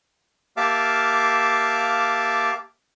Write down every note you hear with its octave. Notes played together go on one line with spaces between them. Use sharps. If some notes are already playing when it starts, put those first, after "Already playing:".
A#3 G4 E5 F5 A5 D6